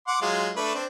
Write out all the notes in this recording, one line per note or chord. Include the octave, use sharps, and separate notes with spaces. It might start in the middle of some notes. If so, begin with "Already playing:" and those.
F#5 C6 D6
F#3 G#3 F4
A3 D4 B4
C4 D4